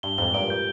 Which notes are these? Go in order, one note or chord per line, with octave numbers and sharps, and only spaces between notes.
G2 G7
F2 G#2 G7
G2 A#2 D7
G6